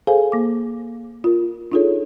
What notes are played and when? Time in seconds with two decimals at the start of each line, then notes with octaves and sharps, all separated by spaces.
0.07 G#4 A4 C5 F5 G#5
0.32 A#3 D6
1.24 F4 A#4
1.72 D4 D#4 F4 G#4 A4 C#5